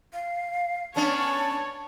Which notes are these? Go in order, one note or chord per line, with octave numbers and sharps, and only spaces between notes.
F5
B3 C#4 D4 C#5 A5